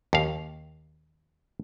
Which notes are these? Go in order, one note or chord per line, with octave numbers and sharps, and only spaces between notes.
D#2 F5